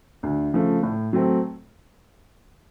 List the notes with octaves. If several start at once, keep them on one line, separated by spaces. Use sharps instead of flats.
D2
C#3 F3 A3
A2
F#3 A3 C4